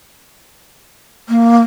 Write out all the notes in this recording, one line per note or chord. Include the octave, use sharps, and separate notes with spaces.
A#3